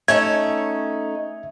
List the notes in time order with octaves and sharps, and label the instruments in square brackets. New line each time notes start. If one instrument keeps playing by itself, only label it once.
[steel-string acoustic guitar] A3 C#4 D#4 [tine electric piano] E5 G#6